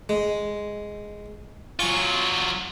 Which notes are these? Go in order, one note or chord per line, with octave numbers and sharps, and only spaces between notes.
G#3
F#3 F4 G#5 C#6